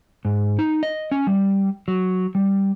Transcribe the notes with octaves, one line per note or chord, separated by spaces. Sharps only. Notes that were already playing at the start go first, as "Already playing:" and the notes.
G#2
D#4
D#5
C#4
G3
F#3
G3